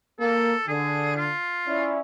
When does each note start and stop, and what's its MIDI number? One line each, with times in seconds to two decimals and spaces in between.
0.20 0.53 58
0.20 0.63 69
0.67 1.31 50
0.67 1.13 68
1.16 1.94 65
1.67 2.00 61
1.67 2.00 64
1.67 2.00 74